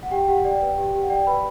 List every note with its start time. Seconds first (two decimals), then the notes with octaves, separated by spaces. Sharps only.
0.03 F#5
0.11 G4 G5
0.28 G4 F#5
0.44 D5 G5
0.61 B4
0.78 G4
0.93 G4
1.02 F#5
1.10 D5 G5
1.27 B4 B5